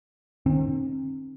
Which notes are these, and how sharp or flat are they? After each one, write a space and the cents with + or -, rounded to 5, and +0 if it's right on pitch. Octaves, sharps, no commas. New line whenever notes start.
D#3 -30 C4 +35